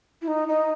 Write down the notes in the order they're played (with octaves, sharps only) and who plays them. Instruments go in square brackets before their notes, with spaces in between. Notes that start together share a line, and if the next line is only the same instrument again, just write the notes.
[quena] E4
D#4
D#4